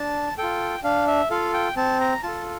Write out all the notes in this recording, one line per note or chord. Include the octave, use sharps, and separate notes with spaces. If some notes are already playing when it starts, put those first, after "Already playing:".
Already playing: D4 A5
F4 A4 G5
D4 F5
E5
F4 A4 F5
G5
C4 A5
A#5
F4 A4 A5